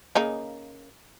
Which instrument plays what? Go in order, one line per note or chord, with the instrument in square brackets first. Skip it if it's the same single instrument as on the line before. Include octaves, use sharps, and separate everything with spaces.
[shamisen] C#3 A#3 D#4